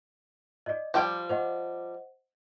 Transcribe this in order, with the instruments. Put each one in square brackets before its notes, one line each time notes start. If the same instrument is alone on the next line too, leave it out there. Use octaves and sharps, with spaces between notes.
[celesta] D5 D#5
[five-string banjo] F3 G3 G5 [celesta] D5 G6
[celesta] C5 D#5 F#5